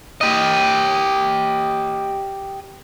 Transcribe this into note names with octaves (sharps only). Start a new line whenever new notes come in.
G4 D#5